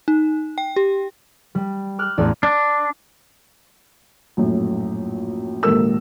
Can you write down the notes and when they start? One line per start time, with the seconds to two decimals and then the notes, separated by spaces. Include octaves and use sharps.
0.08 D#4
0.58 G5
0.76 G4
1.55 G3
1.99 D6 F6 F#6
2.18 A1 E2 A4 D5 A#5 D#6
2.43 D4
4.37 A#1 F#2 A2
5.63 A#1 D#2 G#2 A4 A#4 E6